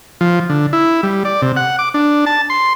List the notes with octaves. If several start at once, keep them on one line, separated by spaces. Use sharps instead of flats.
F3
D3
E4
G3
D5
C3
F#5
D6
D4
A5
C6